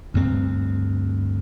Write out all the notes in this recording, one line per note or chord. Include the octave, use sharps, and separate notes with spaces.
D2 G2 C4